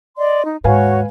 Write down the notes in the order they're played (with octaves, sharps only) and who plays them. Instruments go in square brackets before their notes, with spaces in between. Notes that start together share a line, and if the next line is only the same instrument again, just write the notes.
[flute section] D5 D#5 C6
D#4
[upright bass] D#2 G#2 [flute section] F#4 C#5 [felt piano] B4 F5 G#5